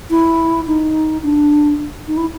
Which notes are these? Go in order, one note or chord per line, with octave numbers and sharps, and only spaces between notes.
E4
D#4
D4
D#4
E4